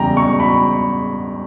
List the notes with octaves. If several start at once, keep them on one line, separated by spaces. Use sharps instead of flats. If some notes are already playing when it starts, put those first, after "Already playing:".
Already playing: E2 C#3 G3 G5 A#5
C#6
B5